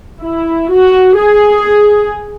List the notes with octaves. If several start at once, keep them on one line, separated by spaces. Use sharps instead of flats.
E4
F#4
G#4